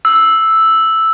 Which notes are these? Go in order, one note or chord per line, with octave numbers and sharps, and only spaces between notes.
E6